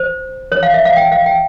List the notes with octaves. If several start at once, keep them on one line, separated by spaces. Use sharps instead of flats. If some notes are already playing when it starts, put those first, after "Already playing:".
Already playing: C5
C#5
F5
E5
F5
G5
F5
G5